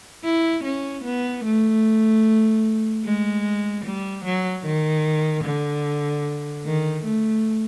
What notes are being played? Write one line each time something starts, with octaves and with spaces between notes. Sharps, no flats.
E4
C#4
B3
A3
G#3
G3
F#3
D#3
D3
D#3
A3